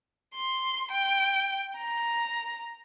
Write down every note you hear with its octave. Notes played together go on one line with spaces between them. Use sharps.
C6
G5
A#5